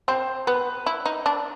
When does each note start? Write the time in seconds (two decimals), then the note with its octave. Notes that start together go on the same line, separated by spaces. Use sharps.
0.08 C4 C5
0.47 B3 B4
0.86 E4
1.06 D#4
1.26 D4